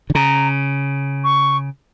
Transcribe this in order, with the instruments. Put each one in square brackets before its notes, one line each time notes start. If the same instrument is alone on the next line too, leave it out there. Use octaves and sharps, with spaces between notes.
[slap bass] D3
[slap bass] C#3 [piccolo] A#5
[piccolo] C#6